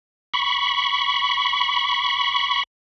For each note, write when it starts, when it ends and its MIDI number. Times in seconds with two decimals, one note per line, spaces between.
0.34 2.63 83
0.34 2.63 85